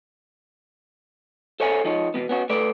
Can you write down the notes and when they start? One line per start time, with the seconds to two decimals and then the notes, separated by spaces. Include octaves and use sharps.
1.60 A4 C5 C#5 E5 G#5
1.85 F3 D#4 C#5
2.14 E2 B2 D#3 F3 B3
2.29 B3 C#4 F#4
2.50 A3 B4 D5